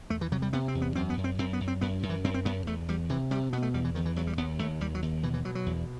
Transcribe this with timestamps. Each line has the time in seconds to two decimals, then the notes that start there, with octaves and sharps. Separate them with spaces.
0.10 E2 A3
0.21 E3
0.32 C3 F#3
0.42 G3
0.53 C3 B3
0.68 C4
0.75 E2
0.82 B3
0.95 F#2 C4
1.10 B3
1.17 F#2
1.24 C4
1.38 F#2 C4
1.53 B3
1.60 F#2
1.68 C4
1.81 F#2 B3
2.03 F#2
2.10 E3
2.24 F#2 C4
2.34 C4
2.45 F#2 B3
2.66 E2 A3
2.88 E2 G3
3.09 C3 E3
3.31 C3 G3
3.53 B2 B3
3.62 A3
3.74 E2 G3
3.85 E3
3.95 E2 D#3
4.06 E3
4.16 E2 F#3
4.27 G3
4.37 D#2 B3
4.59 D#2 A3
4.81 D#2 G3
4.95 F#3
5.02 D#2
5.23 B2 E3
5.34 E3
5.45 B2 F#3
5.55 F#3
5.66 E2